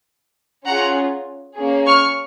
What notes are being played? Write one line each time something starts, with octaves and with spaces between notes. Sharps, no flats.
C#4 F4 G#4 F#5 A#5
A#3 C#4 G#4
C#6 F6